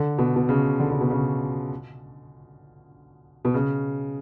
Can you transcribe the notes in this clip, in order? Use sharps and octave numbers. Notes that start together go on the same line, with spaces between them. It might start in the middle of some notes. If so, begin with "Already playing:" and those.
Already playing: D3
B2
B2
C#3
D3
C#3
B2
C#3
B2
C#3